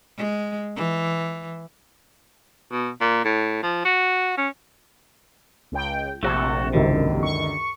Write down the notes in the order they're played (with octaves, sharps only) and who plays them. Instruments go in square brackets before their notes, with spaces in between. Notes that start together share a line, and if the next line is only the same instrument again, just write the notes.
[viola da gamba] G#3
E3
[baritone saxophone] B2
A#2
A2
F3
F#4
C#4
[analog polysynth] C#2 G5
[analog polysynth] A#1 C3 [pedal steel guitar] A3 F#4 A4
[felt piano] C#2 F#2 D#3 [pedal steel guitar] D3
[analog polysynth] C#6